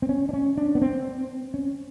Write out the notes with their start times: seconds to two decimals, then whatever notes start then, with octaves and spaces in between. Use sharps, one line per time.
0.02 C4
0.09 C#4
0.29 D4
0.33 C#4
0.57 D4
0.75 B3
0.81 C4
1.54 C#4